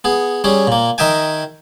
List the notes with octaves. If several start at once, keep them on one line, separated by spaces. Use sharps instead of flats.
B3 G#4
G3 C#4 G#4
A#2 A#3
D#3 A#4 D#5 E5 G5 G#5